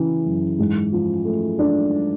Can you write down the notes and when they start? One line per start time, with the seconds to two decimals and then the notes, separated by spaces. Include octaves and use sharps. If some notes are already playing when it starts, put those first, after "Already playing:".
Already playing: C#3 E3
0.26 F#2
0.59 G#2
0.93 F3
1.25 A3
1.59 D4